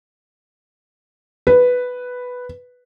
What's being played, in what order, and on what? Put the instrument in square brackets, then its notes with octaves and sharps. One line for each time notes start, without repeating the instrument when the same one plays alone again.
[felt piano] B4